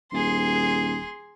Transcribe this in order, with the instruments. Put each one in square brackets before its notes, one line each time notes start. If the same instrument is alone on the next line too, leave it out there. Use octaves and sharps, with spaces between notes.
[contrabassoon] D#1 [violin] G#4 C6